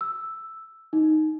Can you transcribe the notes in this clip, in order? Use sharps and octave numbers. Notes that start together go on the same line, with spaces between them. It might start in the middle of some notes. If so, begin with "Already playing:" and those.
E6
D#4